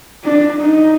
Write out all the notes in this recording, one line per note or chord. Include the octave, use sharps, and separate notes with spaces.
D4
D#4